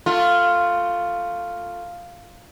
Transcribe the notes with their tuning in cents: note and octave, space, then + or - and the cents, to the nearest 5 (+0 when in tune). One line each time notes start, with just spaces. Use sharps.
A3 +20 F4 +0